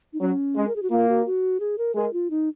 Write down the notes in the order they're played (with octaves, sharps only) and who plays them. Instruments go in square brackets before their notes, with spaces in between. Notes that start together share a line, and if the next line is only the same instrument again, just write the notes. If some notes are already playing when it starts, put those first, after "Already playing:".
[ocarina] D#4
[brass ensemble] F#3 [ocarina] C#4
[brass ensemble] G#3
[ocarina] A#4
G#4
F#4
[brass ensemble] A#3 [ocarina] F4
[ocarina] F#4
F#4
G#4
A#4
[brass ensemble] G#3 [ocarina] A#4
[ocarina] F4
D#4